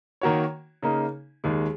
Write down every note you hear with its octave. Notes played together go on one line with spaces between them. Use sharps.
D#3 A#3 F#4 C#5
C#3 A#3 D#4
D#2 D#3 G#3